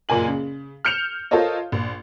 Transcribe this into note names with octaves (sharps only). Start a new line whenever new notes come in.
F#1 A#2 A#3 G#5 F#7
C#3
F6 G6 C#7 E7 F7
F4 A4 A#4 C5 C#5 D#5
A#1